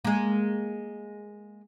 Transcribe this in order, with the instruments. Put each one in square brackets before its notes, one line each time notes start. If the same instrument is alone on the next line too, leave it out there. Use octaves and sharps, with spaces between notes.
[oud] G#3 A#3